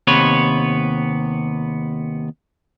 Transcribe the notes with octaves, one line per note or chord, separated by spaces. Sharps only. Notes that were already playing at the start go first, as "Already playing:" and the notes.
D#2 C3 B3 B4 C#5